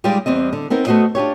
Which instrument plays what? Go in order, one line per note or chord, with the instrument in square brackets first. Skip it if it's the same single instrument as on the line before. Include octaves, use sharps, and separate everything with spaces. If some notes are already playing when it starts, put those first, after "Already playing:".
[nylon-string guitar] G3 G#3 D#4 F4 G4 D5
E2 G3 C4 D#5
D3
B3 C4 D#4 A#4
A3 B3 F#4 C5 D#5
D4 F4 G4 C#5